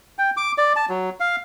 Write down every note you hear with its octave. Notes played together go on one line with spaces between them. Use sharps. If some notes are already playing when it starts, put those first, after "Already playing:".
G5
D6
D5
A5
F#3
F5